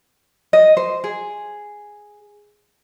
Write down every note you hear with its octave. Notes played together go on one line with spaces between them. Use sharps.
D#5
C5
G#4